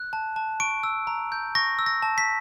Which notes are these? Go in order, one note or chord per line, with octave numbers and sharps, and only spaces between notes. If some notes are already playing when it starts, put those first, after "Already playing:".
Already playing: F#6
A5
A5
C#6 D7
E6
A#5
G6
C#6 A#6
E6
A#6
A5
B6